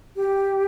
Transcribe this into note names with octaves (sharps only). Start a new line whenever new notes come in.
G4